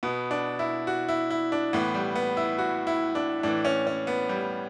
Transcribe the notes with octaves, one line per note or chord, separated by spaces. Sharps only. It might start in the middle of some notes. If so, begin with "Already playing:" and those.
B2 B3
D4
E4
F#4
E4
E4
D4
A2 E3 B3
G3
B3
E4
F#4
E4
D4
A2 E3 D4
C#4
C#4
B3
G3